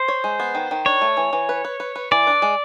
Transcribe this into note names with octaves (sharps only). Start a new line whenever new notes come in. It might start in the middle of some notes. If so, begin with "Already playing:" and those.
Already playing: C5
C#5
G#3
B3
D#3
D#3
D4 C#5
A3
E3
E3
B4
B4
B4
B4
E3 D5
D4
G#3